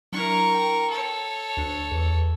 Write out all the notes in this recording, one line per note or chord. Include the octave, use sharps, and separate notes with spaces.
F#3 D4 E4 A#4 C#6
G5
A4 C#5
D2 D4
E2